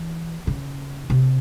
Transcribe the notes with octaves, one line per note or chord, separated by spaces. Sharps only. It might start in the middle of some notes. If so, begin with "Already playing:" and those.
Already playing: E3
C#3
C3